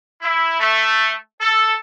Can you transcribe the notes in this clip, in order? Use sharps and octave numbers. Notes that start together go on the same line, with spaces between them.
E4
A3
A4